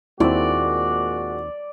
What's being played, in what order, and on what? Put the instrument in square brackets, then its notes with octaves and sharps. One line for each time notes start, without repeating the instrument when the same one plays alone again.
[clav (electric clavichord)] D#2 C4 [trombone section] A#2 G#3 F#4 [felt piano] E4 [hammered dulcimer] D5